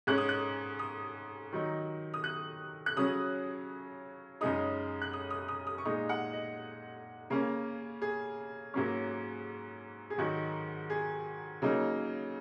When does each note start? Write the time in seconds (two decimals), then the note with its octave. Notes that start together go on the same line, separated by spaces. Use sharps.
0.07 G#2 G#3 C#4 F#6
0.18 D#6
0.29 F#6
0.79 D#6
1.52 D#3 F#3 D#4
2.14 D#6
2.24 F#6
2.86 F#6
2.96 C#3 F#3 C#4 D#6
4.41 F#2 C#3 G#3 D#4 D#6
5.02 F#6
5.13 D#6
5.30 D#6
5.48 D#6
5.67 D#6
5.78 C#6
5.85 A#2 G#3 D#4 D#6
6.09 F#5
6.33 D#5
7.30 C#3 A#3 C#4
8.02 G#4
8.74 G#2 F#3 A#3 C#4
10.10 G#4
10.18 G#2 D#3 F#3 D#4 F#4
10.90 G#4
11.62 C#3 F#3 A#3 D#4